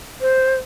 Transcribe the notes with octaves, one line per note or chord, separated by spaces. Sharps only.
C5